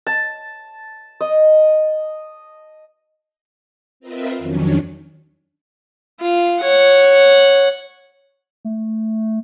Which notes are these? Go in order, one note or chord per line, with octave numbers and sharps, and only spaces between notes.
A5
D#5
C4 F4 A#4 B4 D#5 E5
F2 D#3 F#3 C#4 D4
F4
C#5 F#5
A3